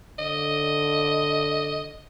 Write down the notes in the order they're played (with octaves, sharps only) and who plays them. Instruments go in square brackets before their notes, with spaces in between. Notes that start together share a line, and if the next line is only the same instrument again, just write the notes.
[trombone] D3 [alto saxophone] D#5